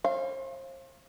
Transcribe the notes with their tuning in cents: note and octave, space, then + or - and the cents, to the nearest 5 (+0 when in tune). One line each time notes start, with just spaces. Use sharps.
C5 +40 F5 -20